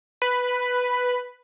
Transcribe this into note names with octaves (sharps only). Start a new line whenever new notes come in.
B4